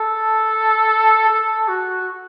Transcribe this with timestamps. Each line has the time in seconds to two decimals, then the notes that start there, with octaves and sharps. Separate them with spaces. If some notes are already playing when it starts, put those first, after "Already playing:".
Already playing: A4
1.30 A4
1.68 F#4